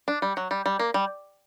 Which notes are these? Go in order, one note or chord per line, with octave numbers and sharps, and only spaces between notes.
D4
G3
F#3
G3
G3
A#3
G3